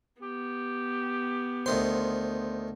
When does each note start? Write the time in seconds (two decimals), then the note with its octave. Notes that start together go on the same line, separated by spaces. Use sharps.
0.22 B3 G4
1.66 D2 D#3 C5 C6